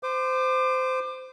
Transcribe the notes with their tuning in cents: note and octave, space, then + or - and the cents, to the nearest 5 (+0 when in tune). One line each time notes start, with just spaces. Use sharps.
C5 -20 D6 +25